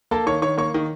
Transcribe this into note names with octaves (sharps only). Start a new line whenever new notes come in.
A#3 A4 A5
D#3 C#5 C#6
D#3 C#5 C#6
A#3 C#5 C#6
D#3